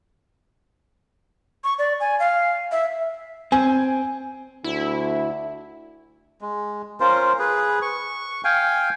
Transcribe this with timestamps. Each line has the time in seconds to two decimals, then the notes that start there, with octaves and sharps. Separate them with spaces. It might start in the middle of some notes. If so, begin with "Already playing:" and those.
1.64 C#6
1.79 D5
2.00 G#5
2.20 F5
2.72 E5
3.52 C4 G#5
4.64 D2 E4
6.41 G#3
7.00 C#4 F4 A#4 C5
7.39 G#4 B4
7.82 C#6
8.44 F5 G5 G#5